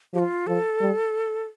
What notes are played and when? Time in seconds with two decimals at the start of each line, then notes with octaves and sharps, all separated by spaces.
0.14 F3 G4
0.19 F4
0.47 F3 A4
0.81 G3